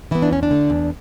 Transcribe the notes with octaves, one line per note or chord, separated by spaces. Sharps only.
E3 B3 E4
D4
E2 C#4
D4
D3 A3
E2